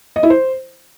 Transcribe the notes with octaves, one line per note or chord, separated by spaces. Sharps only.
D#5
E4
C5